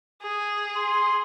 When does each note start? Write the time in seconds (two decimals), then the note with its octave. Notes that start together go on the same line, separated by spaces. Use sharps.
0.22 G#4
0.76 C6